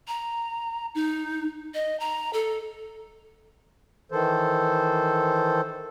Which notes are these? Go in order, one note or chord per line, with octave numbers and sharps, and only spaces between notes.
A#5
D#4
D#5
A#5
A4
D#3 E3 A4 C5